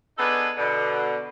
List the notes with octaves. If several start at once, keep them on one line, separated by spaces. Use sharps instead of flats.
B3 D4 D#4 G#4 A4 B4
B2 D3